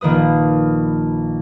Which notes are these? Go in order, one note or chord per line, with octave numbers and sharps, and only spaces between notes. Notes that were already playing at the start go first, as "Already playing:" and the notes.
A#1 D#3 A#3 B4 D#6